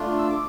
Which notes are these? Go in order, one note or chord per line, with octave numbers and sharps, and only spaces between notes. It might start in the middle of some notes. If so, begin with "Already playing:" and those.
Already playing: A3 D4 F4
E6
D6